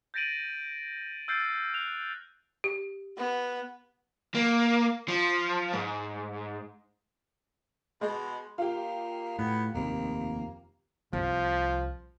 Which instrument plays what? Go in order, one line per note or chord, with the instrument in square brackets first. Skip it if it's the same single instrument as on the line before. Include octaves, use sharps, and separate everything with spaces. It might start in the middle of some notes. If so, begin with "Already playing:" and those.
[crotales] G6 A6 A#6 D7 D#7 F#7
E6 F6 G6 A6 C7 D7
F#6 F7
[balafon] G4
[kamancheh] B3
[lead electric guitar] A#3
F3
G#2
[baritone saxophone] B2 [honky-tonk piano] G#3
[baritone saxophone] A#3 [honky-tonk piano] F4 G4
[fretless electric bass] A2 [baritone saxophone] B3
[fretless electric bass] F1 D#2 C3 [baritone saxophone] A#3
[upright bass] C2 [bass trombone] F3